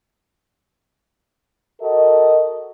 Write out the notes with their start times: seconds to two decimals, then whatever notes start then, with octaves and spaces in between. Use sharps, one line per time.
1.81 F#4 A4 A#4 D#5